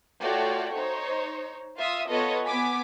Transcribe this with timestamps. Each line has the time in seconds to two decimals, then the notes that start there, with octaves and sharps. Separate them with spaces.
0.21 A3 F4 F#4 C#5 D5 G5
0.74 D#4 C5 C#5
1.78 F4 E5 F5 D#6 E6
2.09 B3 F4 A4 B4 C#5 D#5
2.45 B3 G#5 D6 B6